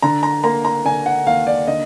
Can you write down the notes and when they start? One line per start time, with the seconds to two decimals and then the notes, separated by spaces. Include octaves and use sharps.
0.02 D3 A#5
0.23 A#5
0.43 A#3 A#5
0.65 A#5
0.85 D3 G#5
1.06 F#5
1.26 D#2 F5
1.47 D5
1.67 D3 D#5